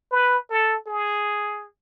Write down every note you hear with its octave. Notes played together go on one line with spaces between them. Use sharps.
B4
A4
G#4